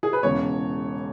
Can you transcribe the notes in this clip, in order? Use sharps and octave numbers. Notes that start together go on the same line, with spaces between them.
G#4
B4
E1 E2 C#3 C#5